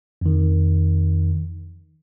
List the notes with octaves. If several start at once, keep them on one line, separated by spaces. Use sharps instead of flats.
F2 D#3